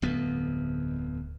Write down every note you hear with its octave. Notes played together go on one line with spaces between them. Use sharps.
D1 F2 B3